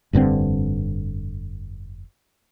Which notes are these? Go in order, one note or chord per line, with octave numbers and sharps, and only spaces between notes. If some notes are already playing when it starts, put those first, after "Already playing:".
F1 G2 D3 C4